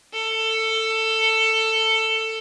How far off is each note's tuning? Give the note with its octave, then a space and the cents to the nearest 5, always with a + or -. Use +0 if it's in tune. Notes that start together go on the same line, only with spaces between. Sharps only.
A4 +15